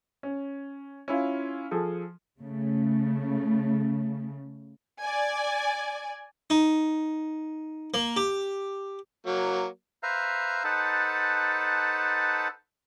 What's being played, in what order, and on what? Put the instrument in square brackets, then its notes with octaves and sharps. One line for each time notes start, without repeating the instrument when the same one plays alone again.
[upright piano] C#4
C#4 E4 F4
F3 G#4 A4
[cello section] C#3 A3
[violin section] D5 G#5
[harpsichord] D#4
A#3
G4
[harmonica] F#3 A#3
[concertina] B4 C5 E5 F5 A#5
D#4 A4 B4 C5 F#5 A5